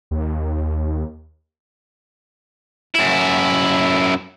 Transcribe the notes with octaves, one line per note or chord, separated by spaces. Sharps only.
D#2
F#2 E4